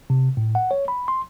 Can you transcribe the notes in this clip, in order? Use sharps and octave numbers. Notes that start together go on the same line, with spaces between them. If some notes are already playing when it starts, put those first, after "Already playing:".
C3
A2
F#5
C#5
B5
C6